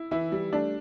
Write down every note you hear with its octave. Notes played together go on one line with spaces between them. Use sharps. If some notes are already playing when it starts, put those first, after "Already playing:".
Already playing: E4
E3 E4
G3
A3 D4